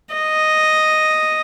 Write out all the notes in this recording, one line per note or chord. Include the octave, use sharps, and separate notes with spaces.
D#5